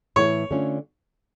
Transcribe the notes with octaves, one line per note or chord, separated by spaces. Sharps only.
A2 E3 A3 E4 C#5
D3 A3 C#4 F4